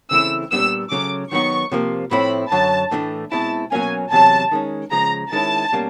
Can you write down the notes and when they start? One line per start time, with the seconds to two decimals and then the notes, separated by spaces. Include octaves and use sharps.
0.11 C#3 E3 A3 C4 E4 E6
0.51 A#2 G3 B3 D4 E6
0.91 C#3 F#3 A3 C#4 D6
1.32 D#3 F#3 B3 D#4 C#6
1.72 C3 F3 A#3
2.11 A2 F3 A3 C4 E4 B5
2.51 F#2 D3 F#3 A5
2.91 A2 E3 A3 D4
3.31 B2 G#3 C4 E4 A5
3.72 B2 F#3 A#3 C#4 G#5
4.12 E2 C3 D#3 F#3 A5
4.52 D#3 G#3 C#4
4.92 C#3 F3 G#3 A#5
5.32 D#3 G#3 C#4 E4 A5
5.73 B2 G3 A#3 C#4